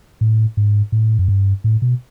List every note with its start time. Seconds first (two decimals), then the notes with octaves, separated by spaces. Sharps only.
0.21 A2
0.57 G#2
0.92 A2
1.19 F#2
1.28 G2
1.64 A2
1.82 B2